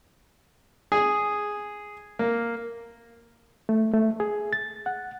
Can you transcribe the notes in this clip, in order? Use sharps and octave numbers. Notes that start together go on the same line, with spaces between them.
G#4
A#3
A3
A3
G#4
A6
F#5